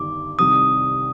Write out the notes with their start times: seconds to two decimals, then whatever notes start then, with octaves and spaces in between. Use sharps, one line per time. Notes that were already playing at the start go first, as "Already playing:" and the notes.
Already playing: G1 G2 D#3 D6
0.39 C2 C3 D#3 G3 D#6